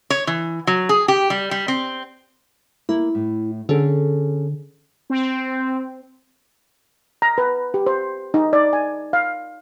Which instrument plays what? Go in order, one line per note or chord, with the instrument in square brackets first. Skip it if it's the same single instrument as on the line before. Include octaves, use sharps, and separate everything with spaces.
[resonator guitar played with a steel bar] C#5
E3
F#3
G#4
G4
G3
G3
C4
[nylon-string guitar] A#3 [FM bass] E4
[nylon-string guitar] A2
[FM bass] D3 [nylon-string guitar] C#4 G#4 A4
[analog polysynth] C4
[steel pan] A#5
B4
G4
C5
D#4
D5
G#5
F5